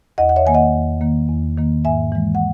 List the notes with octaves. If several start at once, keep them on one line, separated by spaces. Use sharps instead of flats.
E2 D#5 F#5
F#5
C#5 E5
D#3 A#3 G#5
D#5 F#5
E2
D#3 A#3
E2
D#3 A#3
G#2 E5 G#5
E3 G#3
F#5